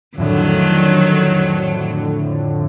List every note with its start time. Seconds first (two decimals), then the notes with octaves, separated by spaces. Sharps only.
0.18 F2 A2 D3 D#3 F#3